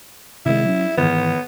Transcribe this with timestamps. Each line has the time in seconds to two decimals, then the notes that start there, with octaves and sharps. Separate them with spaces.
0.46 C3 D#3 G#3 E4
0.65 F#3 C#4
0.98 G#2 D#3 E3 B3